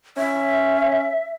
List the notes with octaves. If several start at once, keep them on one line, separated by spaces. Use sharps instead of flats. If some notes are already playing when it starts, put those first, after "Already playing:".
C#4 E5